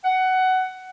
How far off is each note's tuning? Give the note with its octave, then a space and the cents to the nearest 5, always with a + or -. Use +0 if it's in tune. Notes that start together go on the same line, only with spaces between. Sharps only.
F#5 +15